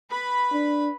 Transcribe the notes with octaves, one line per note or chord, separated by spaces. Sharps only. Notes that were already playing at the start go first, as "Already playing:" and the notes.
B4 B5
D4